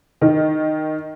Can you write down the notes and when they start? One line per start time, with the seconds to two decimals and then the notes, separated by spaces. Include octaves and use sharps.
0.21 D#3